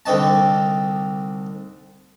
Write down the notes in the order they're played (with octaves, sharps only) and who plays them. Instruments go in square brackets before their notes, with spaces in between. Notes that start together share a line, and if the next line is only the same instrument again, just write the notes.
[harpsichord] C2 D3 C4 D#4 A5